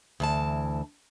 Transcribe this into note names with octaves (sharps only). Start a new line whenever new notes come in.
D2 E3 A5